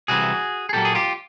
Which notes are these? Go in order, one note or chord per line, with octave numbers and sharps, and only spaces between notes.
C2 C3 E3 F#4 G#4
G#4
A#2 F#3 A#3 G4 A4
G#4
F4 G4